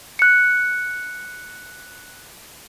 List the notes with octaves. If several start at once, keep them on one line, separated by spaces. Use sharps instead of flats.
F#6 C#7